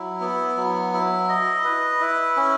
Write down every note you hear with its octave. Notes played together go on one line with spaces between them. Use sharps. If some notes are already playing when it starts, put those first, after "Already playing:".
Already playing: F#3 E4
B3
F#3
E4
D#5
B4
E4
C#4